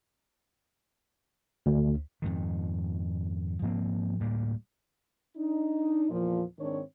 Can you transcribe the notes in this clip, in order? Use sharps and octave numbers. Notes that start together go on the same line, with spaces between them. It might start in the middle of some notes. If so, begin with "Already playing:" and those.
D2
F2 G#2 D#3
G#2 F3 A#3 C4
D2 A2 G3 A#3
D4 D#4
E2 A#2 F3
G#2 D#3 C4 D4 C#5